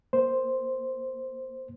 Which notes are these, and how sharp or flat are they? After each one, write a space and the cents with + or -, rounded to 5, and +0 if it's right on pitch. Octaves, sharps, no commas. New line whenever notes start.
A#3 +5 C5 +0